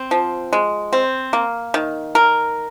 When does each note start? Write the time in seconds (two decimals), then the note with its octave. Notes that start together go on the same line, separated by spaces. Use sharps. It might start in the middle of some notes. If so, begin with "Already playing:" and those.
Already playing: C4
0.11 F3
0.53 G#3
0.93 C4
1.33 A#3
1.74 D#3
2.15 A#4